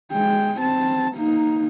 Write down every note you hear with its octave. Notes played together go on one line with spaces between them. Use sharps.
G#3 G5
C4 A5
A#3 D#4